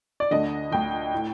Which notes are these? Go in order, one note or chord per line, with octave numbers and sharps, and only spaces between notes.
D5
D2 D3 D#5
D2 D3 G5
A2